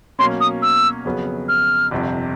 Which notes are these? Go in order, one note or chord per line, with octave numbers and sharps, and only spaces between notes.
B2 F#3 A#3 C#4 C6
D#6
E6
F2 C#3 F#3 B3
F6
G1 F2 C3